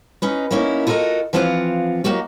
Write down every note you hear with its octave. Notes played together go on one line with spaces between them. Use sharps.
C#4 D#4 B4
A#3 C#4 D#4 E4 A#4
F4 F#4 A4 A#4 D#5
E3 F3 C4 F4 F5 F#5
F#3 A#3 D#4 F#4 G4